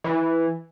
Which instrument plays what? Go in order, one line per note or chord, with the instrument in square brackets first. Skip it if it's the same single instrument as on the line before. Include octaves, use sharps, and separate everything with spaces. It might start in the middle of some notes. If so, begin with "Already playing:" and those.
[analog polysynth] E3